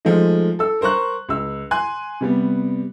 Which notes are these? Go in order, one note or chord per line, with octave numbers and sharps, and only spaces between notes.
F3 G#3 A3 D#4
A4 E6
A#4 C5 A#5 C#6 F#6
C#2 E6
G#5 C6 F#6
C3 G3 B3